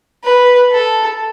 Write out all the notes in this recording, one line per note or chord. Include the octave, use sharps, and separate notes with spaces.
B4
A4